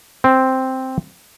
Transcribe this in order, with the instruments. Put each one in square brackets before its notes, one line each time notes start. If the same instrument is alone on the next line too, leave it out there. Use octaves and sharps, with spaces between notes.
[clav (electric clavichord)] C4